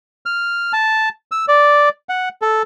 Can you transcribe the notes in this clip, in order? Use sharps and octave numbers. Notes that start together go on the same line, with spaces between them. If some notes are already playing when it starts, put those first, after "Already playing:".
F6
A5
E6
D5
F#5
A4